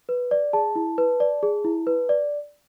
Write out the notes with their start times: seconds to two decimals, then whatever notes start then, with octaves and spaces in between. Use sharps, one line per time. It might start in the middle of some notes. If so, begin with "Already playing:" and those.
0.09 B4
0.31 D5
0.53 G#4 A5
0.76 E4
0.98 B4
1.20 D5
1.43 G#4
1.64 E4
1.87 B4
2.09 D5